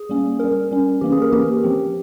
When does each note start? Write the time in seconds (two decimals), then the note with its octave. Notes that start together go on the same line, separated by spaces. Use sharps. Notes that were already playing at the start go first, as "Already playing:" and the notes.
Already playing: G#4
0.09 G3 A#3 C#4
0.39 G3 C#4 A#4
0.71 G3 C#4
1.01 E3 A#3 C#4 G4
1.12 G#4
1.22 A#4
1.32 E3 A#3 C#4 G4
1.63 F3 C4